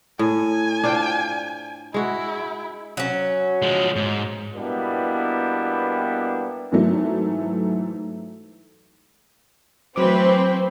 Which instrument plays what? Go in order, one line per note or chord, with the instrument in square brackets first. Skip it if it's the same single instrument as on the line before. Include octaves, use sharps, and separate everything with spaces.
[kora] A2 [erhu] G#5
[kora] D4 F4 C5
[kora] G#3 F#4 [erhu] E4
[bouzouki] F#3 C#4
[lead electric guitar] F3 G#3
G#2
[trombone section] B2 G3 A#3 B3 D4 E4
[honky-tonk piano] G#2 E3 F#3 A3
[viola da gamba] E3 A3 B4 [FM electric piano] F#3 D6 [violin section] C4 [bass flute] C5